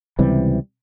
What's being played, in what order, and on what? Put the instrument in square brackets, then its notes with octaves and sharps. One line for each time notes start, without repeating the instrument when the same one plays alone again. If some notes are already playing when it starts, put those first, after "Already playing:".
[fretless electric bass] C#2 C3 E3 G3